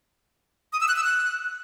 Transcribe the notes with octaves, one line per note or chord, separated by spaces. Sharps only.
D#6
E6
F#6
E6
F#6